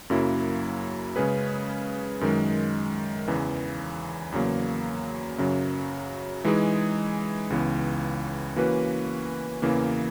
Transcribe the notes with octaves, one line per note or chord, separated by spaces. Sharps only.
F#2 C#3 F#3 A#3 E4
C#3 G#3 C#4 G#4 B4
F#2 D#3 G#3
E2 C#3 E3
E2 C#3 F#3 A#3
F#2 C#3 F#3
E3 G#3 D#4 G#4
C#2 C#3 E3 B3
E3 A#3 C#4 F#4 B4
E2 C#3 E3 A#3